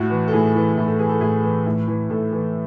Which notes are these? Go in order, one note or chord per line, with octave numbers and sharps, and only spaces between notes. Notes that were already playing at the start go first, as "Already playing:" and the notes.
Already playing: A2 F#4
E3
A4
A2 G#4
E3
A2
A4
E3 G#4
A4
A2 G#4
E3
A2
E3
A2 A4
E3